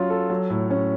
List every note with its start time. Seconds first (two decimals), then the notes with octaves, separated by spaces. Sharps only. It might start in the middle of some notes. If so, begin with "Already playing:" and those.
Already playing: F#3 C#4 F4
0.10 A4
0.30 F#3
0.50 A2
0.70 C#4